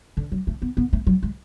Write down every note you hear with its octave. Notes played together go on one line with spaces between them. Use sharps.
D3
F#3
A3
B3
B3
A3
F#3
G#3